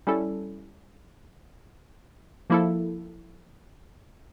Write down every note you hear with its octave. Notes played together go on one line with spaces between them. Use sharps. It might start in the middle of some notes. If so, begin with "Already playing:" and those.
G3 C#4 E4 A4
F3 A#3 E4 A4